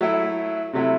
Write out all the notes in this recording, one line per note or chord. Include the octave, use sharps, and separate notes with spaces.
F#3 A3 E4
C3 F#3 A3 E4